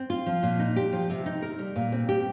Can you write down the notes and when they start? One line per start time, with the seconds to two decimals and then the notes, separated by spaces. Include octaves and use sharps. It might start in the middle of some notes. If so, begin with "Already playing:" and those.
Already playing: C4
0.10 F4
0.26 F3
0.43 A#2
0.59 D#4
0.76 G4
0.93 F3
1.10 C3
1.26 D#4
1.42 A#4
1.59 G3
1.76 A#2
1.92 C4
2.09 G4